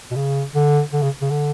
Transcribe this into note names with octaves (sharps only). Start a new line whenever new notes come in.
B2
C#3
D3
D3
C#3
C#3
D3